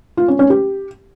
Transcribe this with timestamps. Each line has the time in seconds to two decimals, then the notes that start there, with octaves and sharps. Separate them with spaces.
0.17 F4
0.28 C#4
0.39 C#4
0.50 G4